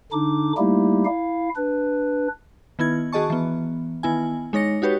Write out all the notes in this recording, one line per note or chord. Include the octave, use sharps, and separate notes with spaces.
D3 D4 D#4 D6
G3 A3 A#3 D#4 E4 G4
E4 F5
D4 B4
D#3 B3 E4 G#6
D#3 F#4 G#4 D#5 A5 C#6
E3 B3
D#3 B3 E4 G#5
G#3 D#4 C#5 A#6 C#7
D#4 F#4 G4 B4 C#5